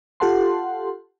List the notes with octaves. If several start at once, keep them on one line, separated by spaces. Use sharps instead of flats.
F4 G4 A4 F#5 A5 C6